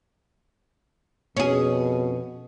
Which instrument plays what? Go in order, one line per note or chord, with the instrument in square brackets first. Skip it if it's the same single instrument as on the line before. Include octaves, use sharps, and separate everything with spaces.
[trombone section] F2 B2 [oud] C#4 G#4